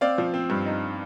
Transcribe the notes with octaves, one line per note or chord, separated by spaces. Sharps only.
C4 D5 F5
F3
C4
G2
D#4